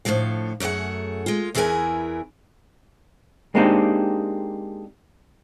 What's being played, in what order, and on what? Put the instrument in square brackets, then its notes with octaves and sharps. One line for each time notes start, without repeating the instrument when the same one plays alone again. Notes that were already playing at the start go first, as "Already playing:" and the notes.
[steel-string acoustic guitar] A2 D3 F3 F#3 F5
F#2 A3 E4 G#4 F#5
G#3 F4
E2 E3 E4 G#4 A#4 G#5
[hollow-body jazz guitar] G#3 A#3 C4 D4 D#4 G4